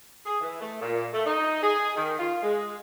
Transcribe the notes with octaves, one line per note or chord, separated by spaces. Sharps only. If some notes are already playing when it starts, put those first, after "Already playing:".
G#4
E3
A3
A#2
A3
D#4
G#4
D#3
F4
G#3